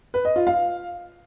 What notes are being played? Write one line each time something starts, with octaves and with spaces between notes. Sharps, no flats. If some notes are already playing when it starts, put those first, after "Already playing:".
B4
D#5
F4
F5